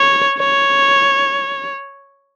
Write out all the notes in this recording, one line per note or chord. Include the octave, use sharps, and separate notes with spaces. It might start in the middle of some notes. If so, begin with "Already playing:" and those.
Already playing: C#5
C#5